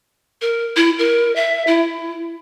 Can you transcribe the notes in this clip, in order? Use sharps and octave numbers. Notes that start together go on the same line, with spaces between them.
A#4
E4
A#4
E5
E4